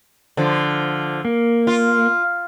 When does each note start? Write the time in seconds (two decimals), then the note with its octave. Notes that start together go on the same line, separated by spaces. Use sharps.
0.37 D3 F3
1.25 A#3
1.67 F4